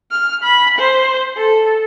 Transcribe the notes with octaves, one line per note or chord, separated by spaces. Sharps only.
F6
B5
C5
A4